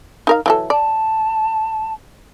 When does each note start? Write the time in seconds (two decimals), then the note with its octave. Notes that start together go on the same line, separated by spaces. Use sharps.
0.27 D#4 A#4 F5
0.46 E3 F#3 A4
0.70 D5 A5